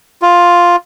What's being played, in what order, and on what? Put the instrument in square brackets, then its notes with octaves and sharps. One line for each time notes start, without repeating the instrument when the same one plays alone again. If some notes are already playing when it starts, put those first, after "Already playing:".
[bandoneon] F4